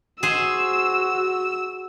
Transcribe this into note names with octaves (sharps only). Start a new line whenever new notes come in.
F#4 G#4 C5 E6